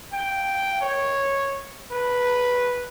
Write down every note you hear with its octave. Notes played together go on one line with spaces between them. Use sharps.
G5
C#5
B4